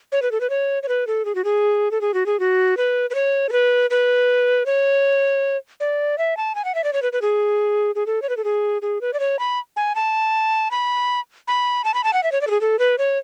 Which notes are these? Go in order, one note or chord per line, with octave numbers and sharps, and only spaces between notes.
C#5
B4
A4
B4
C#5
C#5
B4
A4
G#4
F#4
G#4
A4
G#4
F#4
G#4
F#4
B4
B4
C#5
A4
B4
B4
C#5
D5
E5
A5
G#5
F#5
E5
D5
C#5
B4
B4
G#4
G#4
A4
C#5
B4
A4
G#4
G#4
B4
D5
C#5
B5
G#5
A5
B5
B5
A5
B5
A5
F#5
E5
C#5
D5
A4
G#4
A4
B4
C#5